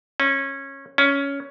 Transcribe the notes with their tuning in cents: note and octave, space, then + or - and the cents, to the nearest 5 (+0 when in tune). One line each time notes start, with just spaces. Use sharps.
C#4 -20
C#4 +10